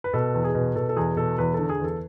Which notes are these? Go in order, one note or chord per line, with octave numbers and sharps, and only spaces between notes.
B4
B2 A4
E2
G#4
B2
B2 A4
A4
E2 G#4
B2 A4
E2 B4
D3 A4
G#4
E2 A4